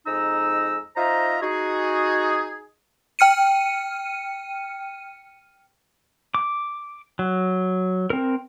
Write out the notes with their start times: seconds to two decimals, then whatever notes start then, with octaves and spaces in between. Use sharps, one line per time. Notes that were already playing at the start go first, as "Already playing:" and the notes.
0.06 F2 G#3 D#4 D#5 A#5 E6
0.96 D#4 F4 C5 E5 A#5
1.42 D#4 F#4 G#4
3.19 G5 F6 C#7 D#7
6.34 D6
7.19 F#3
8.10 C4 A#4